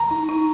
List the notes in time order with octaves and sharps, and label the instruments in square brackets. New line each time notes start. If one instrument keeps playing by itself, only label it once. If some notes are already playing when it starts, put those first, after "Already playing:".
Already playing: [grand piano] A#5
[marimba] D#4
D#4